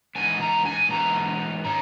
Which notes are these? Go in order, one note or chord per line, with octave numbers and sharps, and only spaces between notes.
G#2 E3 B3 G#5
A#5
G#5
G#2 E3 B3 A#5
D#3 A#3 C#4 A#5